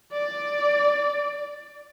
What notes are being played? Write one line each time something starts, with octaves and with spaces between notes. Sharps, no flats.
D5